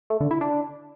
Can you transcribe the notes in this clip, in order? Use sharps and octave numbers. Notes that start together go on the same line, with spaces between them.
A3
D3
E4
D4